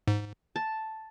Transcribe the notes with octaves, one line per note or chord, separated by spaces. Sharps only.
G#2
A5